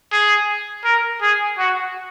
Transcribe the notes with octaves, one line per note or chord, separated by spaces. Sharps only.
G#4
A#4
G#4
F#4